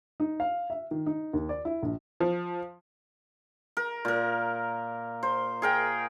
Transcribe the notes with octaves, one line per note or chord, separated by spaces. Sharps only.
D#4
F5
E5
D#3
D#4
D#2
D5
E4
A#1
F3
A#4
A#2 A#4
C5
G#4 A#4 G5